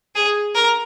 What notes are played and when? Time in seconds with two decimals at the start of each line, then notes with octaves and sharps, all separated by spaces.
0.15 G#4
0.54 A#4